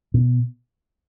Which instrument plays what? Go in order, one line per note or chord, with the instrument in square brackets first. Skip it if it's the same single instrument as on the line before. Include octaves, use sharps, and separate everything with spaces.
[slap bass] B2